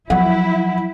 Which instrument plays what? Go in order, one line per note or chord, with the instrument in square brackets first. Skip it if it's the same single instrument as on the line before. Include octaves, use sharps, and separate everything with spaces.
[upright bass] F3 F#3 [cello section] E4 [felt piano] F#5